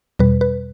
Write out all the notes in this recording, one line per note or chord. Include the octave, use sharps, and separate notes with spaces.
E2 B2 G3 B4
B4